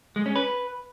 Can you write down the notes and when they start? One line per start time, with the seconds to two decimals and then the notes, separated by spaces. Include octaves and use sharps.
0.16 G#3
0.26 C#4
0.36 B4